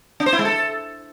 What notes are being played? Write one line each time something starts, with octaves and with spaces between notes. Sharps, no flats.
D4
C5
E4
G#3
A4